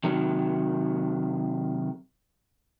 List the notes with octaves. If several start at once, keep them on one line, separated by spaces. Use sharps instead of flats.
C3 D#3 F#3